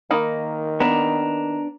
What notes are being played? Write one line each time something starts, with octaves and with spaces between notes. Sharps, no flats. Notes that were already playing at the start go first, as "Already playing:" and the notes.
D#3 A#3 D#4 B5
B3 D4 A#5